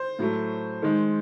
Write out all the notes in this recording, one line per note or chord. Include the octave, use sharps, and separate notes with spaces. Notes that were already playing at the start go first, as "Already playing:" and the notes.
Already playing: C5
A2 F#3 A3
D#3 G#3